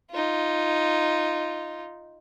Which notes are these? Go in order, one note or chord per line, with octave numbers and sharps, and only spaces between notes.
D#4 F4